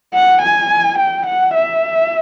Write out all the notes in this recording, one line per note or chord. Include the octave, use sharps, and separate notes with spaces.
F#5
G#5
G5
F#5
E5